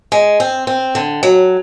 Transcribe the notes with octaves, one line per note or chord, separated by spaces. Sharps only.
G#3
C4
C4
D3
F#3